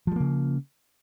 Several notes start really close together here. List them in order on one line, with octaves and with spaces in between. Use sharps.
F3 G3 A#3 C#3